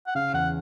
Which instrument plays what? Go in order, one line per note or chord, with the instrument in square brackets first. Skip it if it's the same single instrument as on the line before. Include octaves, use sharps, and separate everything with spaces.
[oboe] F#5
[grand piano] C#3 [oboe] F5
[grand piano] E2 [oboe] F#5